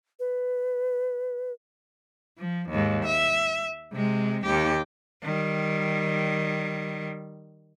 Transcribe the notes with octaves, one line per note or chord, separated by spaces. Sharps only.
B4
F3
D#2 G#2
E5
C3 G#3
D#2 G4
D#3 G3